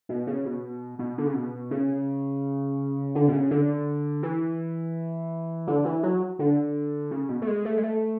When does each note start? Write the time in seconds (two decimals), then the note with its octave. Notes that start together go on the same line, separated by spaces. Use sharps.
0.09 B2
0.27 C#3
0.45 B2
0.99 B2
1.18 D3
1.26 C#3
1.35 B2
1.71 C#3
3.15 D3
3.28 B2
3.33 C#3
3.51 D3
4.23 E3
5.67 D3
5.85 E3
6.03 F#3
6.39 D3
7.11 C#3
7.29 B2
7.42 A3
7.47 G#3
7.65 A3
7.77 G#3
7.83 A3